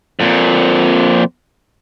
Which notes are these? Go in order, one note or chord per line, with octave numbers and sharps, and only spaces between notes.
F2 A#2